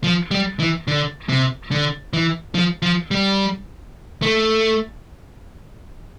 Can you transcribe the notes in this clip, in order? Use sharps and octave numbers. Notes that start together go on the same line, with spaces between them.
F3
G3
E3
D3
C3
D3
E3
F3
F3
G3
A3